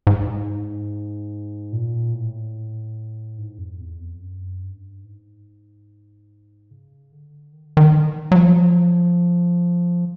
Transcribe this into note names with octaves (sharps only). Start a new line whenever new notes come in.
G#2
A#2
A2
G#2
F2
E2
F2
F#2
G2
G#2
C#3
D3
D#3
D3
D#3
F#3
F3